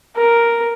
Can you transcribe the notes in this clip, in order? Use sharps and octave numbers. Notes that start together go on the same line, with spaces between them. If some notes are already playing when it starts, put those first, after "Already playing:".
A#4